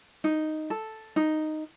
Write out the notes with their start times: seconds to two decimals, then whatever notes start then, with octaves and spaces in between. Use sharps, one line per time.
0.24 D#4
0.70 A4
1.16 D#4